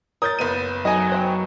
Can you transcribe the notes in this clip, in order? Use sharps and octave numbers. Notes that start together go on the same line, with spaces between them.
A#4 C#5 D#6 G6 A6
F#1 B3 D#7
F#3 D#4 D#5 G#5
C5 G5